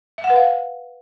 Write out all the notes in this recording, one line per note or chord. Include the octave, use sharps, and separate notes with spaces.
E5
F#5
B4
F5